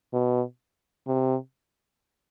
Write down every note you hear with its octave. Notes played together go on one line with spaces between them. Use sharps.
B2
C3